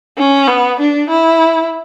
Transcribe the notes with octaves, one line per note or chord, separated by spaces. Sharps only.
C#4
B3
D4
E4